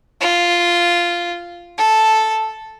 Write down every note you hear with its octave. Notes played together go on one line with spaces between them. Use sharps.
F4
A4